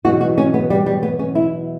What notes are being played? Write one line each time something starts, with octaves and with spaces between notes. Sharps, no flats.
E2 B2 F#3 F#4
F#4
C#4
B3
G3
G3
B3
C#4
E4